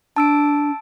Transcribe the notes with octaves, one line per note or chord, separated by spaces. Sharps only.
D4 A5 E6 D7